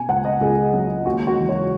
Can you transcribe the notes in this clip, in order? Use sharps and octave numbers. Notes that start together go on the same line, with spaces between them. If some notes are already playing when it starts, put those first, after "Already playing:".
Already playing: B2 G#5
C#2 F#5
D#5
C#2 G#4
F#3
D#2 F#4
F#4
E3
C#5